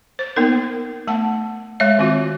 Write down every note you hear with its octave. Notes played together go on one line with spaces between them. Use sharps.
C5
A#3 B3 D#4 A#4
A3 F#5 A5
G#3 C#5 E5
D#3 C4 F4 F#4